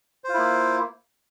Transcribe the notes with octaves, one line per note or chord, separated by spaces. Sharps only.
A#3 E4 F4 C5